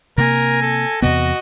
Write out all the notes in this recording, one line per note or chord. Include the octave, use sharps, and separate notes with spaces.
C3 A#3 A#4 G#5 A#6
A4
E2 C3 B3 F#4 D#5